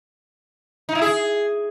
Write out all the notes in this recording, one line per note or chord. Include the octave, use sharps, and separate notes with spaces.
D#4
E4
G#4